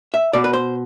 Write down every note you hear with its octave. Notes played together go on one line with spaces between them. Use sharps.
E5
B2 D5
B4
C5